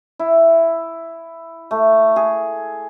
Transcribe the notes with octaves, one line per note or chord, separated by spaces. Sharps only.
E4
A3
G#4